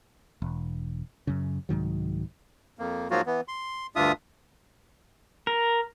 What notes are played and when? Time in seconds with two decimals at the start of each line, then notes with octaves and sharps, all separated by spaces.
0.42 E1
1.27 F#2 C#3
1.69 C2 G#2 D#3 F#3
2.79 F2 A#3
3.11 G#2 F3 F#3 A#3 F4 F#4
3.26 E3 B3
3.48 C6
3.96 D2 G2 D4 F4 E5 D#6
5.47 A#4